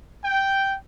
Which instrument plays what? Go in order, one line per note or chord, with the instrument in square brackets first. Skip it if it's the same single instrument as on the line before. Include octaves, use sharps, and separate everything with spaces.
[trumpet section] G5